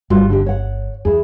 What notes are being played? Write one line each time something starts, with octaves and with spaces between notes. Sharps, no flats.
G1 G3 F4 F#4
D3 G4
C#5 F#5
E2 E4 G#4